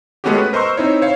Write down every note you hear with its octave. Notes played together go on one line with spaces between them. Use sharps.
G#3 A3 B3 C#4 F#4 G4
B4
A#4 C5 D#5 C6 C#6 E6
C4 D#4 E4 C#5
C5 C#5 F5